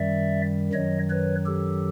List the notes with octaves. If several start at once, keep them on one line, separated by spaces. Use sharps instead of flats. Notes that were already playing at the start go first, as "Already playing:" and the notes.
Already playing: F#2 D#3 G3 D5 E5
F#2 D#3 F#3 C#5 D#5
B4 C#5
G4 A4